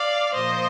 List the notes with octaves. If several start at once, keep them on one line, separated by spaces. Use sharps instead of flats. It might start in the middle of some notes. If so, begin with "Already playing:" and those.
Already playing: D5 F5
A#2 F3 C5 D#5